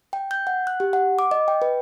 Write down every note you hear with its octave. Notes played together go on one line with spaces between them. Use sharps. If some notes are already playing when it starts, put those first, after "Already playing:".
G5
G6
F#5
F#6
G4
F#5
D6
D#5
G5
B4